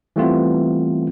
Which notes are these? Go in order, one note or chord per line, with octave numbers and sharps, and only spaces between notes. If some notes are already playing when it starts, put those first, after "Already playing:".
E3 G3 A3 B3 C4 F4